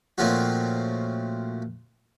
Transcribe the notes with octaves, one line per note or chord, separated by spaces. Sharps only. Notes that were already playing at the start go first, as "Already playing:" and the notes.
A#2 F3 A3 C4 C#4 F#4